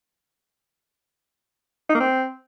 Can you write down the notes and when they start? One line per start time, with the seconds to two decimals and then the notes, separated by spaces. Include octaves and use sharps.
1.89 D#4
1.95 A#3
2.00 C4